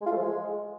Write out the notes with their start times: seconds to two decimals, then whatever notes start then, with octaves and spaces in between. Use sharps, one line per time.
0.01 G#3
0.06 F4
0.11 A3
0.16 F3
0.21 G#3